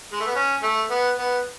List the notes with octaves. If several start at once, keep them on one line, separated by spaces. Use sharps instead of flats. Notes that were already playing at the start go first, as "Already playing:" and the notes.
G#3
A3
B3
C#4
A3
B3
B3